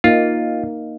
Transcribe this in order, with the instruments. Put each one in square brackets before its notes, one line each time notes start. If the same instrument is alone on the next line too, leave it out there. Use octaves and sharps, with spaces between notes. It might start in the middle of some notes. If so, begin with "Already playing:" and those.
[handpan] A#3 D#4 [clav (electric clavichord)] F4